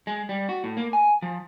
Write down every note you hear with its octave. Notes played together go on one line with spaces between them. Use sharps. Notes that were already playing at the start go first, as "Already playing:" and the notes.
G#3
G3
F#4
A2
A#3
G#5
F3